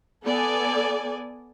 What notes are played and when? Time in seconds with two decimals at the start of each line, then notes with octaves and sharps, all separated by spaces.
0.24 B3 A4 D5 G#5